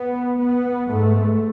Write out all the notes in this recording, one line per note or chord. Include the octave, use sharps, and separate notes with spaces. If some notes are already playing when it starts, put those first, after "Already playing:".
Already playing: B3
B3
G#2 A3